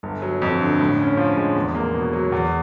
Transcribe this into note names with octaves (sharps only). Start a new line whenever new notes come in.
G1
F#3
F2
D3
A2
C#4
F3
G#3
E2
A#3
B2
F#3
E2